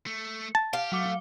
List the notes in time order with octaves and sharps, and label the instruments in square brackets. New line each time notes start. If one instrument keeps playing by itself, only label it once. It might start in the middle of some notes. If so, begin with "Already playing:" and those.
[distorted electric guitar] A3
[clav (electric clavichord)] A5
[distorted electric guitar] G4 [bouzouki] F5
[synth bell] F#3 D6 G7 [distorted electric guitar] A3